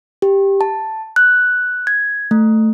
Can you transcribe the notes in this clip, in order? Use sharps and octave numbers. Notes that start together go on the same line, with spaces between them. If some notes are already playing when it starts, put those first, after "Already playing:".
G4
A5
F#6
G#6
A3